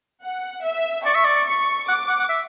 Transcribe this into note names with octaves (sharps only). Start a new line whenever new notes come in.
F#5
E5
D5 C#6
E5
D5
C#6
F#5 D6
F#5
F#5
E5